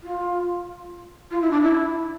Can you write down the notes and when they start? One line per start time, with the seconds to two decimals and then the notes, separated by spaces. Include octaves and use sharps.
0.03 F4
1.31 F4
1.41 E4
1.51 D4
1.62 E4